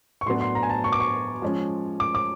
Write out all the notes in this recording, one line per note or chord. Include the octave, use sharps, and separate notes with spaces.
C#6
A2 F#3 B3 D4 C6
C6
A#5
G#5
A5
C#6
D6
C#6
F3 G#3 C#4
D6
D6